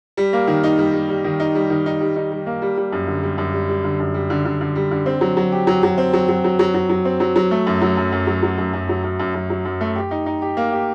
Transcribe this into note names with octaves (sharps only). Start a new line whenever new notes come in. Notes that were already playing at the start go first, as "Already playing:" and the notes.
G3
A#3
D#3
D#4
G3
G3
G3
D#3
D#4
G3
D#3
D#4
G3
D#4
G3
A#3
G3
G3
F#2
D3
G3
F#2
G3
G3
D3
F#2
G3
D3
D3
D3
G3
D3
C4
F#3
F#3
G4
F#3
F#3
C4
F#3
F#3
F#3
F#3
F#3
F#3
C4
F#3
F#3
A3
F#2
F#3
F#2
F#2
F#3
F#3
F#2
F#2
F#3
F#2
F#2
F#2
F#3
F#2
A3
G4
D#4
D#4
G4
A#3
G4